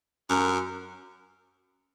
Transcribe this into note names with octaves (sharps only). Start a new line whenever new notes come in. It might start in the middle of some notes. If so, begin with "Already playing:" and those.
F#2